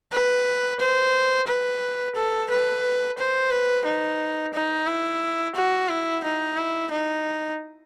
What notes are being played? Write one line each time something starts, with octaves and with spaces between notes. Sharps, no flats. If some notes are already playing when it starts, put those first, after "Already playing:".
B4
C5
B4
A4
B4
C5
B4
D#4
D#4
E4
F#4
E4
D#4
E4
D#4